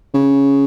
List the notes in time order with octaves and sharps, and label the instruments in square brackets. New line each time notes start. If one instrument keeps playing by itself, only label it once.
[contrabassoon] C#3